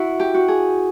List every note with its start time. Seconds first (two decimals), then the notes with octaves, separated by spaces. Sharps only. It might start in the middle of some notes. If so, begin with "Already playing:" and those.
Already playing: E4 F#4
0.20 G4
0.34 F#4
0.48 G#4